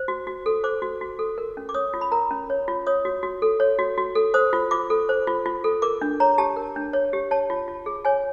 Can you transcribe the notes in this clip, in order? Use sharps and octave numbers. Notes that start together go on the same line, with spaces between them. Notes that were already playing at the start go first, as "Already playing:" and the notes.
Already playing: C5
F#4
F#4
A4
C5 D6
F#4
F#4
A4
A#4
C#4
D6
C#5 D#6
F4
B5
A#4 A#5
C#4
C#5
F4
C#5 D#6
F#4
F#4
A4
C#5
F#4
F#4
A4
C5 D#6
F4
F4 D6
A4
C5
F4
F4
A4
A#4 D6
D4
C#5 A#5
G4 A5
A#4
D4
C#5
G4
C#5 A5
F4
F4
G#4
C#5 G#5